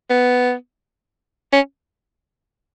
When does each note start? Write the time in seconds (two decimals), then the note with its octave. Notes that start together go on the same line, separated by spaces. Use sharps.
0.10 B3
1.53 C#4